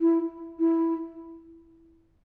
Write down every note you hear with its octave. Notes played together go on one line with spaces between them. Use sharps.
E4
E4